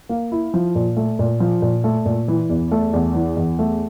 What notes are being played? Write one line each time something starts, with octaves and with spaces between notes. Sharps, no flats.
A#3
E4
F3
A#2
A3
A#2
F3
A#2
A3
A#2
E3
E2
A3
E2
E3
E2
A3